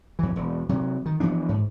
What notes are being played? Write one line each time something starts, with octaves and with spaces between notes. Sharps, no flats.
F2 E3
E1
C3 F#3
D#3
E3 F3 B3 D4
G#2